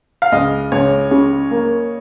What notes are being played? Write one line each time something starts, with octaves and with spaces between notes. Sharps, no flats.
F5
C#2 D#5
C#2 C#5
C#3
A#3